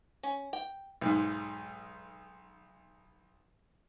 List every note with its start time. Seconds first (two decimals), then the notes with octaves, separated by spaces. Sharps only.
0.23 C#4
0.53 G5
1.01 B1 G#2